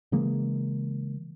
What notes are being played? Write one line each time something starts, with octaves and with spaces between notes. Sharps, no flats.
C#3 E3 G#3 A#3